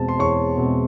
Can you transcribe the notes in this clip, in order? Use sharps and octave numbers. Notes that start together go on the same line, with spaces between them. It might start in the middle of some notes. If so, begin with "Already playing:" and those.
Already playing: E2 B2 G#3 C4 A5
C6
E2 C#5 C#6
B2 G#3 C4